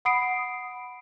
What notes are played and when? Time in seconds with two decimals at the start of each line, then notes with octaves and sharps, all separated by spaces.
0.05 F#5 B5 D#6 C7 D7